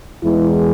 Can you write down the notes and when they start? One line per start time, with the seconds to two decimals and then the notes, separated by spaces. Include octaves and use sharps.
0.24 E2 E3 G#3 E4